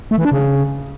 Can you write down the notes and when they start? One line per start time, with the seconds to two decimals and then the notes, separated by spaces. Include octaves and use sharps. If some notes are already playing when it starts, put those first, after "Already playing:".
0.11 A3
0.18 E3
0.25 D4
0.32 C#3